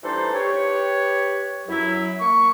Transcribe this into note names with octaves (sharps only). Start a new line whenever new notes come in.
E3 G3 D4 D#4 A4 C5
G4 B4 C#5
F#2 F#3 E4
A#3 C#6